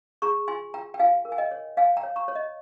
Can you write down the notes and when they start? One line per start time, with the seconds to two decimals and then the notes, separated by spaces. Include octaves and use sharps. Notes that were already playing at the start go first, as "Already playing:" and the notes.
0.22 G#4 A#5 C#6
0.48 F4 G#5 C6
0.74 F4 G5 A#5
0.94 G5
0.99 F4 F5 G#5
1.25 A#4
1.32 G#5
1.38 D#5 G5
1.51 C#5
1.77 C#5 F5 G#5
1.97 G5 A#5
2.03 C#5
2.16 A#5 C#6
2.28 C#5
2.35 D#5